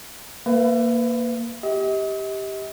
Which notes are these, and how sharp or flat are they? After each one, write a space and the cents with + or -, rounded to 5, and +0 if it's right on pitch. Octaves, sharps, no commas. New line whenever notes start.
A#3 +0 B4 +25 E5 +35
G4 +0 D#5 +40